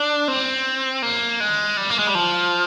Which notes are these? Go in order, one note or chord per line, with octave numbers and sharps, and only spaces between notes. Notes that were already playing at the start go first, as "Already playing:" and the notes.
Already playing: D4
C4
A#3
G#3
G3
A#3
G#3
G3
F3